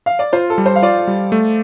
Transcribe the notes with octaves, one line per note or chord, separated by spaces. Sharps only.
F5
D5
F4 C5
A4
G3
C5
F5
F4 D5
G3
A3